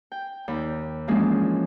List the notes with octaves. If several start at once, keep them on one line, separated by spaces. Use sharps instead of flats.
G5
D#2 D5 G5 B5
E3 F3 G#3 A#3 C#4 D4